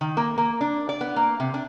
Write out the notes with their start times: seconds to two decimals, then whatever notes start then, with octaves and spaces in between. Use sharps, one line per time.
0.01 D#3
0.17 A#3
0.38 A#3
0.61 D4
0.89 D5
1.01 B3
1.16 A#3
1.40 C3
1.54 D4